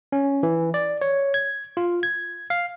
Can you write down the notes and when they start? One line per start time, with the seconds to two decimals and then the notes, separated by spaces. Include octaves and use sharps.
0.12 C#4
0.43 E3
0.74 D5
1.01 C#5
1.34 G#6
1.77 F4
2.03 G#6
2.50 F5